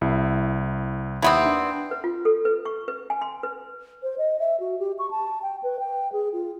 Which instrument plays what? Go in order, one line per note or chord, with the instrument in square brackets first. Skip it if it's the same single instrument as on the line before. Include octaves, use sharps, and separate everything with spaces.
[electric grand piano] C2 E4
[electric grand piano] D#2 [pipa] E3 B3 C4
[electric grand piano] D4
[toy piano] B4
F4
A4
B4
C#6
B4
G#5
C6
B4
[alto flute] C5
D#5
E5
F#4
G4
C#6
A5
G5
B4
G5
G#4
F4